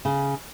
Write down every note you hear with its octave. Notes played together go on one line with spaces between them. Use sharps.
C#3